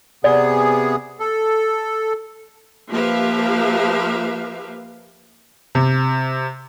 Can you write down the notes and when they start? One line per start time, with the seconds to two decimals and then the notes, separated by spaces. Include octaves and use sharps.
0.24 C3 B3 G#4 D5
1.19 A4
2.90 F3 A#3 G4 B4 E5 F5
5.75 C3